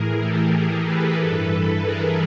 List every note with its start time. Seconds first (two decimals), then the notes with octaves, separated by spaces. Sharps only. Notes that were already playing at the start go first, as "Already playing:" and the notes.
Already playing: A2 E3 G#4 A#4
0.21 G4 A4
0.54 G#4 A#4
0.87 A4 B4
1.19 G2 E3 A4 B4
1.85 G#4 A#4